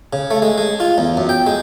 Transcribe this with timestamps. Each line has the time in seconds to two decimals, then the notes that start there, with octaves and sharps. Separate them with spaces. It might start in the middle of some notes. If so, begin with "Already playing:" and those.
0.13 C#3
0.31 A3
0.42 G#3
0.58 G#3
0.80 F4
0.98 E2
1.17 F#2
1.29 G5
1.47 G#3